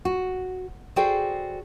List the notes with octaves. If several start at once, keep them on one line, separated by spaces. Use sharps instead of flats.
F#4
F#4 G#4 A4 C5 D5 G5